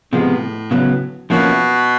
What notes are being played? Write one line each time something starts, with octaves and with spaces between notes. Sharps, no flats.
A2 C3 F3 G#3 B3
C#3 F#3 B3
B2 F3 A#3 C#4 E4